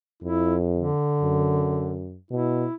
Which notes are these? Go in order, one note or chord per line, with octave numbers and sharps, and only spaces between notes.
F2 E4
D3
F#2
B2 E4